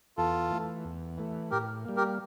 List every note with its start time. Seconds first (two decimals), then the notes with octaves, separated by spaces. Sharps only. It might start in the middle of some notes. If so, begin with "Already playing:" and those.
0.17 E2 F4 A4
0.51 E3 A3
0.85 E2
1.18 E3 A3
1.51 A2 G4 A#4
1.85 G3 A#3
1.97 G4 A#4